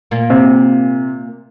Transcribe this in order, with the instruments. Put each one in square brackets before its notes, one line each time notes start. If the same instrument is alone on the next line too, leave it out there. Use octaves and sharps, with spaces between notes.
[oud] A#2 A#3
[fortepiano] C3